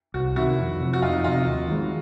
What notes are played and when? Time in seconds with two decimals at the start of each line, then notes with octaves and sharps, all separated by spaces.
0.14 C2 F#4
0.36 C3 D#3 E4 F#4
0.58 F2
0.80 C3 F3
0.93 F#4
1.02 F2 D#4 F4
1.24 C3 F3 D#4 F4
1.46 D#2
1.68 D#3 G#3